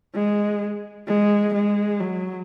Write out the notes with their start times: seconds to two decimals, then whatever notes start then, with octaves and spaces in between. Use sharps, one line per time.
0.15 G#3
1.08 G#3
1.55 G#3
2.00 F#3